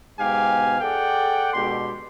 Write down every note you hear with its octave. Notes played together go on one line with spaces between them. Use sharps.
G#2 B2 G4 F5 G#5
G#4 A4 D5 F#5 G5
B2 G#3 D4 G4 C6